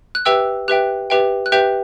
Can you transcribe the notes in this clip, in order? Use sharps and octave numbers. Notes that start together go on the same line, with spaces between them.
F#6
G4 B4 E5 G5 E6
G4 B4 E5 G5 F#6
G4 B4 E5 G5
F#6
G4 B4 E5 G5 G6